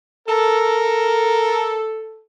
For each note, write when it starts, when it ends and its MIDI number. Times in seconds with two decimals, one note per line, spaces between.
0.28 2.22 69
0.28 1.79 70